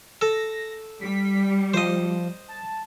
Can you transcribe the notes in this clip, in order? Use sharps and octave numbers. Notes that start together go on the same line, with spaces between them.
A4 A#6
G3 B6
F3 C5 D#5
A5